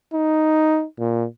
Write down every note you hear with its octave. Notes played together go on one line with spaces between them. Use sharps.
D#4
A#2